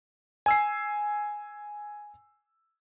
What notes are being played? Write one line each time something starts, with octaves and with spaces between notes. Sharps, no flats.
G#5 E6 C7